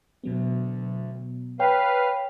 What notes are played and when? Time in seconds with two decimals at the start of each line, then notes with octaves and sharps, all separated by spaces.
0.24 D2 B2 F#3 B3
1.59 B4 C#5 F5 G5